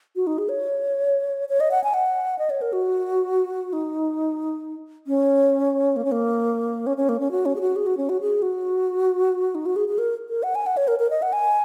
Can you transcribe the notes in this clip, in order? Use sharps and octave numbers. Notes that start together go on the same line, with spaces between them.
F#4
D#4
G#4
C#5
C#5
D#5
F#5
G#5
F#5
D#5
C#5
A#4
F#4
D#4
C#4
A#3
C#4
A#3
C#4
C#4
A#3
C#4
F#4
C#4
G#4
F#4
G#4
F#4
C#4
F#4
G#4
F#4
D#4
F#4
G#4
G#4
A#4
A#4
F#5
G#5
F#5
C#5
A#4
A#4
D#5
F#5
G#5